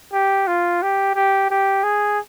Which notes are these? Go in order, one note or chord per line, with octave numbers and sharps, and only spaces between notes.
G4
F4
G4
G4
G4
G#4